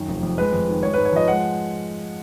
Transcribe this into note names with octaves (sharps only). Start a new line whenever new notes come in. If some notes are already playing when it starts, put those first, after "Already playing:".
Already playing: F#2 D#3
F1
F2
G#3 B4
F2
D#3
G#3 C#5
G#2 B4
C#5
F3 D#5
G#3 F#5